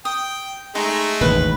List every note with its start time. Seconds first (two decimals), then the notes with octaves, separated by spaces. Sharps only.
0.05 G5 D#6
0.75 G#3 A3 D#4
1.21 E1 A1 D#2 B4